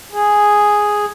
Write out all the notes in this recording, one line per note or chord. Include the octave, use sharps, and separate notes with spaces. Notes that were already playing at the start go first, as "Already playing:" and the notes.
G#4